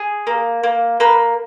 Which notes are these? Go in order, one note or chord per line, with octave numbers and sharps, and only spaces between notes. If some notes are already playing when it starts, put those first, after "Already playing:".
Already playing: G#4
A#3
A#3
A#3 B4